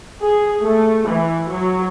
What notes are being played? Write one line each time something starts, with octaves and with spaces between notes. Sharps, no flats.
G#4
A3
E3
F#3